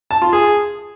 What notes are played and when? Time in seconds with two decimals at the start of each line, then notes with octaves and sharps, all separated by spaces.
0.11 A5
0.22 F4
0.33 G#4